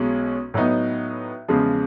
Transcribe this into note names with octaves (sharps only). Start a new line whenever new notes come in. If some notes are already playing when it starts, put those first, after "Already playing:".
Already playing: B1 B2 G#3 C#4
A2 F#3 B3 D#4
E2 C#3 F3 G#3